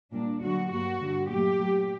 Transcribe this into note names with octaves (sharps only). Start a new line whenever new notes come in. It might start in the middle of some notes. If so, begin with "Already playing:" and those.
A#2 G3 A#3 D4
D2 D3 F#3 A#3 F#4
G2 F#3 A#3 F#4
G2 D3 G3
A#2 F#3 A3 G4
A#2 F#3 A3